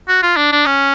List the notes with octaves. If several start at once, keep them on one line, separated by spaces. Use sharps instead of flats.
F#4
F4
D4
D4
C#4